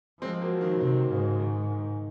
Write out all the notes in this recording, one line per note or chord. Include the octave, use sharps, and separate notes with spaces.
F3 G#3 C4
C4
F#3 A#3
D#3 F#3
C3 D#3
G#2 C#3
D#3
D#3